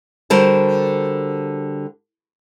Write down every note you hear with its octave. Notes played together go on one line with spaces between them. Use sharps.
D3 G3 F#4 A#4 C5 A5